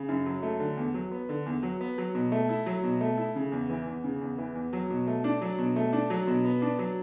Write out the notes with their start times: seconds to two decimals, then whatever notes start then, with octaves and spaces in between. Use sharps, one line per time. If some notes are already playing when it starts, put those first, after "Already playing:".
Already playing: C#3
0.09 F#2
0.26 F#3
0.43 A3
0.60 D3
0.77 E2
0.94 F#3
1.11 B3
1.29 D3
1.46 E2
1.63 F#3
1.81 B3
1.98 F#3
2.15 B2
2.32 A3
2.49 E4
2.66 F#3
2.84 B2
3.01 A3
3.18 E4
3.36 C#3
3.52 E2
3.69 E3
3.87 E2
4.04 C#3
4.21 E2
4.38 E3
4.55 E2
4.73 F#3
4.90 B2
5.07 A3
5.24 D4
5.41 F#3
5.58 B2
5.76 A3
5.93 D4
6.10 F#3
6.27 B2
6.45 B3
6.62 D4
6.79 F#3